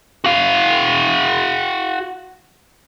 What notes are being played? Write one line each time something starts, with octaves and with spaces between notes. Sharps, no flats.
F#4 F5